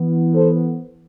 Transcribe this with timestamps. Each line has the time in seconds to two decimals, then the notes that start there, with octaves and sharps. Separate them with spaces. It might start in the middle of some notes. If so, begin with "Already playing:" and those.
Already playing: E3 B3
0.34 A4 C5